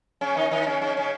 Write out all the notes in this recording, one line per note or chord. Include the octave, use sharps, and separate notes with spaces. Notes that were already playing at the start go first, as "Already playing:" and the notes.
C#3 C#4
D#3 D#4
D#3 D#4
C#3 C#4
C#3 C#4
C#3 C#4